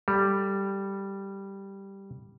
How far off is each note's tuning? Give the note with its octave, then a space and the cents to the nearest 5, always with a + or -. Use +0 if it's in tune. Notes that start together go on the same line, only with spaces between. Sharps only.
G3 +0 A4 +0